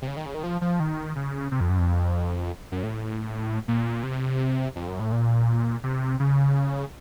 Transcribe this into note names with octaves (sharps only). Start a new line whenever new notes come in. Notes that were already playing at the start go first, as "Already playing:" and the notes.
C3
C#3
D#3
C#3
D#3
F3
F3
D#3
C#3
C3
F2
F#2
F2
F#2
A2
A#2
C3
F2
F#2
A2
A#2
C3
C#3